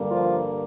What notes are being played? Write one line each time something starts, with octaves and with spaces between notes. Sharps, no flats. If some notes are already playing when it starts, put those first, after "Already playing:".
Already playing: G2 D3 G3 A#3
F3 F4